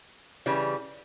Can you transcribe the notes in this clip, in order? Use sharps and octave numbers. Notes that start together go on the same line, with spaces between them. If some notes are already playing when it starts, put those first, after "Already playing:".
C#3 E3 G3